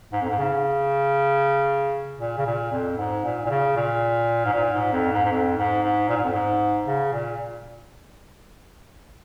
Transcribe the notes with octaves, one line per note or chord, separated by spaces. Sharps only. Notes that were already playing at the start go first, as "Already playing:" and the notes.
G#2
F2
G#2
C#3
A#2
C#3
A#2
F2
G#2
A#2
A#2
C#3
A#2
G#2
A#2
G#2
F2
G#2
G#2
F2
G#2
G#2
A#2
G#2
F2
G#2
C#3
A#2